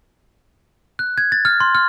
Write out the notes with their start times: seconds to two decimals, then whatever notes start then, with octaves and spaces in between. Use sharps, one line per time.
0.99 F#6
1.18 G#6
1.32 A6
1.45 F6
1.60 C6
1.75 F6